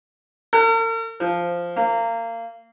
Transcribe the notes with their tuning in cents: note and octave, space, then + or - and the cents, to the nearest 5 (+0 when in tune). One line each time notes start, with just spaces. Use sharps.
A#4 -45
F3 -5
A#3 -25